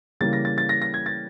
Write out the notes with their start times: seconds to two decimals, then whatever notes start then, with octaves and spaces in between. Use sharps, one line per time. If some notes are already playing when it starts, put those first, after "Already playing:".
0.21 C#3 E3 G3 A#3 A6
0.33 A#6
0.45 A6
0.58 A6
0.69 A#6
0.82 A#6
0.94 G#6
1.06 A6